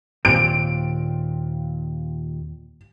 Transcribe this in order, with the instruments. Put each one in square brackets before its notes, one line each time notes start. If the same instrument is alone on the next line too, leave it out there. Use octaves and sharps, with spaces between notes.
[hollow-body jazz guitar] D#2 A#2 C4 [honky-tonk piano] D7